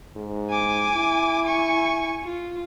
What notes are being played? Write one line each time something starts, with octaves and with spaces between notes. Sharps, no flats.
G#2
G#5 D6
E4
G#5 C#6
F4